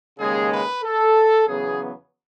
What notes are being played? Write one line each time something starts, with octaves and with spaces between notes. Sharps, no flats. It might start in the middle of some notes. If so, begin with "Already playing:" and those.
D#2 C#3 G#3 G#4
B4
A4
E2 C#3 F#3 B3 G#4